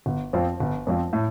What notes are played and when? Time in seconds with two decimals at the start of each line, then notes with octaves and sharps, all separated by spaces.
0.06 G1
0.33 F2 F3 C4 F4
0.60 G1
0.87 F2 F3 C4 F4
1.13 A2